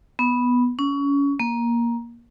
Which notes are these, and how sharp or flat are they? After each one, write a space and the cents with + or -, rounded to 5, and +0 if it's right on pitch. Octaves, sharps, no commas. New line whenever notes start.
B3 -5
C#4 +25
A#3 +15